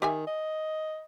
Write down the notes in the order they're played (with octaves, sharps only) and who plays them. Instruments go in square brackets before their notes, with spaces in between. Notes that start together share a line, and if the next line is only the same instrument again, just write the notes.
[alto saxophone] D#3 [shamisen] G4 E5 G#5
[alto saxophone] D#5